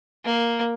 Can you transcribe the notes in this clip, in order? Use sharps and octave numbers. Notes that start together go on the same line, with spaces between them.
A#3